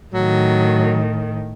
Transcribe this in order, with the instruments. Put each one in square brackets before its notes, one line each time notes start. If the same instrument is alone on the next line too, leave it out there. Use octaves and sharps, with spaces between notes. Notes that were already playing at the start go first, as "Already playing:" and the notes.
[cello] A2 D#3 [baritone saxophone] F#3